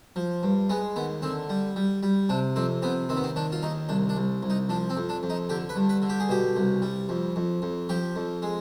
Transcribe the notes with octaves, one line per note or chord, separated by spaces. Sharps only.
F3
G2
G#3 B3
D#2 B3
D3 C4
G3
G3
G3
C3 D4
F2 C4
C3 B3
D#2 C4
B3
C4
D#3 D4
F4
D#2 D#4
C2 D4
D4
C2
C2
D#4
F3 D4
C4
F2
D4
F2
D#4
D3 G4
B4
G2
B4
D3
G4
G#4
B2 G4
C2
G3
F2
F2
F2
F3 G4
F2
G#3